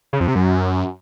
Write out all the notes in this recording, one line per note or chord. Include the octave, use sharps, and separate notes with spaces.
C#3
F2
C3
F#2